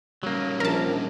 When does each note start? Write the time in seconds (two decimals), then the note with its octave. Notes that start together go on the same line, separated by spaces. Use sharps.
0.23 F#3 G3 A#3 C#4
0.60 A#1 A#4 A5